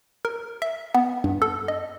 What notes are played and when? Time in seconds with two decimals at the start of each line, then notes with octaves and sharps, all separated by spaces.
0.25 A#4
0.62 E5
0.95 B3
1.24 G2
1.42 A4
1.68 D#5